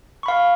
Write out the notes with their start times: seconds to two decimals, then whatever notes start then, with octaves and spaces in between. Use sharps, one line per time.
0.23 C#6
0.26 B5
0.28 F5